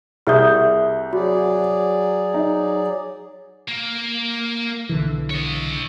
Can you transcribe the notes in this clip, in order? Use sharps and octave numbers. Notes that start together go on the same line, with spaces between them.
C2 G3 G#4 E5 D#6 G6
F#3 F#4 G#4 D5
D#4
A#3
B1 D3 E3
C#5 D#5